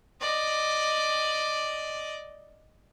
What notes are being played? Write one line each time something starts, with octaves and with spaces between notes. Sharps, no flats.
D5 D#5